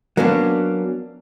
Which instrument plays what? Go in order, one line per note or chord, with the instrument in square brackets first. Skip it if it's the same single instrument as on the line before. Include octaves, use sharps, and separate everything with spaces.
[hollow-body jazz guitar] F#3 A#3 B3 C#4 D4